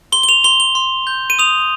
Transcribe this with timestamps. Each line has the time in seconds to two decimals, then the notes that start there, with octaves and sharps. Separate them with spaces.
0.12 C6 G7
0.23 G7
0.29 F7
0.44 C6 G7
0.60 G7
0.75 C6
1.07 G6
1.30 D#7
1.39 D#6 F7